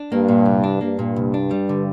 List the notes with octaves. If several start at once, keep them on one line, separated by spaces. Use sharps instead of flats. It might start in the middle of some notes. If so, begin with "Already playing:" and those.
Already playing: D4
G2 A#3
A#2
C2
D4
G2 A#3
A#2
C2
D4
G3
D3